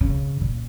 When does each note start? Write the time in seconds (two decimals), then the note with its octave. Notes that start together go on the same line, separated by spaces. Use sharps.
0.01 C#3
0.41 A#2